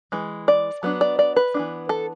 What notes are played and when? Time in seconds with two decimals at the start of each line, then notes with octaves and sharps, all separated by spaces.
0.12 E3 G#3
0.48 D5
0.83 F#3 B3 D4
1.01 D5
1.19 D5
1.36 B4
1.54 E3 B3 D4
1.89 A4